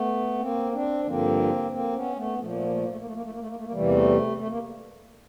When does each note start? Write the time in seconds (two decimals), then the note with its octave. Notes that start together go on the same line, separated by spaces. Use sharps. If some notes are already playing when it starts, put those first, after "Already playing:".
Already playing: A3 B3
0.39 A#3 C4
0.72 C4 D4
1.05 G2 D3 F3 A#3 C4
1.71 A#3 C4
1.94 B3 C#4
2.15 A3 B3
2.38 A#2 F3 A3
2.47 A#3
2.55 A3
2.63 A#3
2.72 A3
2.80 A#3
2.88 A3
2.98 A#3
3.05 A3
3.13 A#3
3.22 A3
3.31 A#3
3.39 A3
3.47 A#3
3.56 A3
3.64 A#3
3.71 E2 C3 E3 G3 A3
3.81 A#3
3.89 A3
4.37 A3
4.48 A#3